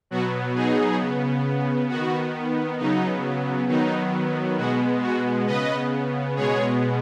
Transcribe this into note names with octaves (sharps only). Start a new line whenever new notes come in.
B2 F#3 B3 F#4
D#4 G#4
C#3 B3
D#3 B3 F#4
C#3 F#3 B3 D#4
D#3 F#3 B3 D#4
B2 G#3 B3 F#4
F#4
C#3 B3 B4 D#5
B2 G#3 B3 G#4 C#5